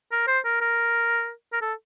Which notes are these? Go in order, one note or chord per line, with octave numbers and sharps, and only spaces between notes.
A#4
C5
A#4
A#4
A#4
A4